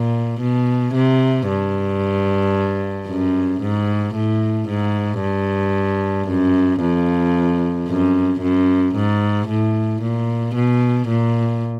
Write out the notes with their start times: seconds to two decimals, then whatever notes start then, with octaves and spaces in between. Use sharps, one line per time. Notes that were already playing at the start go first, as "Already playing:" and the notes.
Already playing: A#2
0.41 B2
0.94 C3
1.48 G2
3.08 F#2
3.61 G#2
4.15 A2
4.68 G#2
5.21 G2
6.28 F#2
6.81 F2
7.88 F#2
8.42 F#2
8.95 G#2
9.48 A2
10.02 A#2
10.55 B2
11.08 A#2